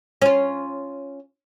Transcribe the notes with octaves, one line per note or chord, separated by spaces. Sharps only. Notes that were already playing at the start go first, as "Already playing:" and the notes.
C#4 F4